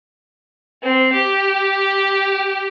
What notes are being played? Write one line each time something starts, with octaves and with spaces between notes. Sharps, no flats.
C4
G4